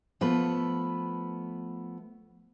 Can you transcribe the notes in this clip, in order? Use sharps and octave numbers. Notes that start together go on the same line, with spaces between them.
F3 A3 B3 B4